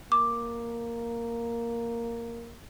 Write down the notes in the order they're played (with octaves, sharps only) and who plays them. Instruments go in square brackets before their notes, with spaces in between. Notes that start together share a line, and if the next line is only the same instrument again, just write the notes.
[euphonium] A#3 [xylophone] D6